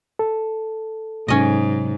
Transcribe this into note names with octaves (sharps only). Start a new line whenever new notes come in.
A4
G#2 C3 F#3 C#4 D#5